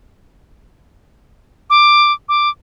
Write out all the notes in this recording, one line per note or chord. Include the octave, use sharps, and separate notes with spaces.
D6
D6